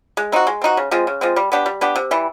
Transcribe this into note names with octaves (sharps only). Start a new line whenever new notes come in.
G#3
C4 D#4 F#4
G#3
C4 D#4 F#4
C#3
F3 G#3 C4
C#3
F3 G#3 C4
G3
B3 D4 G4
G3
B3 D4 G4
C3
E3 G3